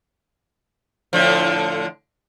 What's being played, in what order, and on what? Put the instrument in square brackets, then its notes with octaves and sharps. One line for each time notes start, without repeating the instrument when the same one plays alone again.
[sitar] A2 D3 F3